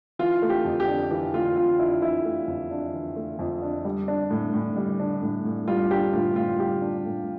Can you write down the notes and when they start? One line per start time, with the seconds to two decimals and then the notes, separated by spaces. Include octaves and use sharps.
0.19 E3 F4
0.42 A3
0.50 G4
0.65 F2
0.80 G4
0.88 D4
1.11 E3 G4
1.33 A3 F4
1.56 F2 F4
1.79 D4 E4
2.02 E3 E4
2.25 A3
2.48 F2
2.71 D4
2.93 E3
3.16 A3
3.39 F2
3.63 D4
3.85 G3
4.08 D4
4.30 A2
4.54 A2
4.76 G3
5.00 D4
5.22 A2
5.45 A2
5.68 G3 F4
5.91 D4 G4
6.13 A2 F4
6.36 A2 F4
6.59 G3 G4
6.82 D4
7.05 A2